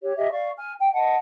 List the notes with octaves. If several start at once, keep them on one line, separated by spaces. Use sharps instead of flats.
G4 C#5
G4 D#5 E5
D5 F5 C#6
G#5 F6
G5
D#5 F#5 A5